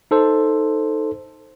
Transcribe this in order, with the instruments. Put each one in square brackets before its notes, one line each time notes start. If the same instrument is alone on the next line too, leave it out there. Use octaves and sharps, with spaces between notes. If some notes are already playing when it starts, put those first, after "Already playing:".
[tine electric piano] D#4 A4 C5